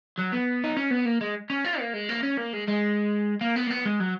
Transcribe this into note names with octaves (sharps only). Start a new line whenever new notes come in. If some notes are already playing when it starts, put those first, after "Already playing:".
F#3
B3
D#4
C#4
B3
A#3
G#3
C#4
F4
A#3
G#3
A#3
C#4
A#3
G#3
G#3
A#3
B3
A#3
B3
G#3
F#3